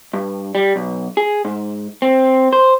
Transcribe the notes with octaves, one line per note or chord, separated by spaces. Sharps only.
G2
G3
B1
G#4
G#2
C4
C5